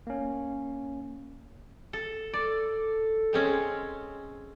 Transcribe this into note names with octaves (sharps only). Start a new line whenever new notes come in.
A#3 C#4
A4
A4 D5
G#3 C4 C#4